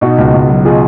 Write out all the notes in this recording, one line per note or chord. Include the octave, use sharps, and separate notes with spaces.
B2 D#4 F#4
C#2
C#2
F#3
B2 F4 G#4